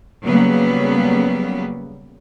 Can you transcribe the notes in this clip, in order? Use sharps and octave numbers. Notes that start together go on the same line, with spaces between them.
C#3 F#3 G3 A#3 B3